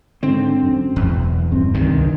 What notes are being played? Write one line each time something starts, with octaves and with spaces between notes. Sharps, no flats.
G#2 D3 C4
F#2
E1 E2
D1 G2 C4
C#2 G2 D#3
C#2 C3 D4